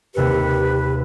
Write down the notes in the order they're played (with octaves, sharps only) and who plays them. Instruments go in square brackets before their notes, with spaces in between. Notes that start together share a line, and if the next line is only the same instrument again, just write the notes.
[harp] D#2 C3 C#7 [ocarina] G4 [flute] B4